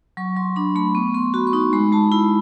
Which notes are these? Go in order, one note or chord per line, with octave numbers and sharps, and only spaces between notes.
F#3 C#6
F#3 C6
D4 B5
A3 B5
B3 C#6
B3 C6
F#4 B5
C#6
D#4 C6
G#3 B5
G#3 A5
E4 B5